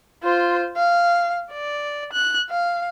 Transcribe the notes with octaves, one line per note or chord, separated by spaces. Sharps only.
F4 C5
F5
D5
F#6
F5